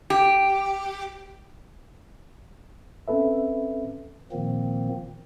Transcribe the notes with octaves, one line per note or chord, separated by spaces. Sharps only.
G4
C4 C#4 A4 B4 E5
A#2 D#3 F3 A#3 C4